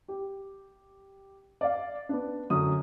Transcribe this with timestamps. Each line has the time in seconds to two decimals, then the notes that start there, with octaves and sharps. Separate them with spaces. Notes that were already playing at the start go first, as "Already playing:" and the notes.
0.08 G4
1.61 D5 F5
2.09 B3 D4
2.50 F#2 D3 D#6